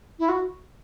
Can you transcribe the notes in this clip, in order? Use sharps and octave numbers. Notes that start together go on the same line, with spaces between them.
E4
F#4